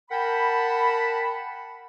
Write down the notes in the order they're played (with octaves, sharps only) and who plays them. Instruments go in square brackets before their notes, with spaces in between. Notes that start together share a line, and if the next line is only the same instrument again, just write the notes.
[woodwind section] A#4 F#5 G5 A5 B5